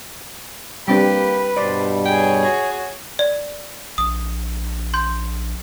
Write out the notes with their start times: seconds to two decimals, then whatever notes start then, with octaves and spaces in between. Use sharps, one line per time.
0.88 G3 A#3 C4 D4 G4 B4
1.57 G2 B2 G3 C5 D5
2.06 G#4 C#5 G5
2.45 F#4
3.19 D5
3.98 A#1 D#6
4.94 C6 G6